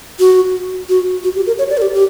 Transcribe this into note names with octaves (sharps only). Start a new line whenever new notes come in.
F#4
F#4
F#4
G4
A#4
C#5
D5
A#4
G4
G4